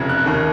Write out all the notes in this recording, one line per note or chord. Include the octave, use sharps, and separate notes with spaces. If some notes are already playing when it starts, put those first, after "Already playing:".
Already playing: F1 F2 C#3 G#6
F#6
D#2 D#3